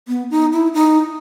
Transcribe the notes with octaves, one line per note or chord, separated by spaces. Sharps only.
B3
D#4
E4
D#4